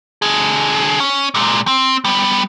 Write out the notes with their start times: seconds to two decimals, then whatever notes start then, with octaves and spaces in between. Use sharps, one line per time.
0.22 D3 G#4
1.00 C#4
1.35 A#2 G#3
1.67 C4
2.05 G3 B3